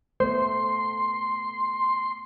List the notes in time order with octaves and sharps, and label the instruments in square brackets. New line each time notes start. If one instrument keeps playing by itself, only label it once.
[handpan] A3 B3 [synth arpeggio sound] C5 [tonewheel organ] C6